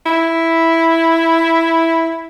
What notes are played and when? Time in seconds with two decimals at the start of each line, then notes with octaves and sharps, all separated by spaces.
0.06 E4